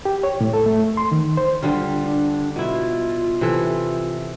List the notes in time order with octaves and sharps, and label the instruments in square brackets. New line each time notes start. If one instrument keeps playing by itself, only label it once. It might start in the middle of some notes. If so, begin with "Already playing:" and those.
[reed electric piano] G4
C#5
A2
A4
A3
C6
D#3
C5
[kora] D3 G3 F4
[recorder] D4
[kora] B2 E4 [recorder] F4
[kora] C3 E3 A4